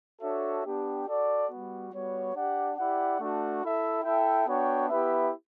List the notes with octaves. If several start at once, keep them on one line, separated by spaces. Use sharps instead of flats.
D4 F#4 A4 C#5 E5
B3 D4 G4
F#4 A4 D5 F#5
G3 B3 F#4
G3 B3 F#4 C#5
D4 G4 D5 F#5
E4 G4 D5 F#5
A3 D4 F#4
E4 A4 E5
E4 A4 E5 G5
B3 D4 F#4 C#5 G5
B3 E4 G4 B4 E5